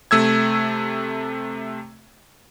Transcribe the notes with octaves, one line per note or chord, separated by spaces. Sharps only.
C3 A3 E6 G#6